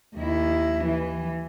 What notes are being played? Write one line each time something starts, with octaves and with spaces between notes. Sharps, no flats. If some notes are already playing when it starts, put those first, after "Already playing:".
D#2 E4
E3